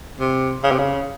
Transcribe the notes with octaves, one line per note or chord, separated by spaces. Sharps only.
C3
C#3
C3
C#3